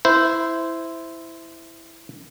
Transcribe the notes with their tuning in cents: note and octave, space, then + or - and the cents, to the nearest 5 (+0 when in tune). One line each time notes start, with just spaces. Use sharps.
E4 +0 C5 -15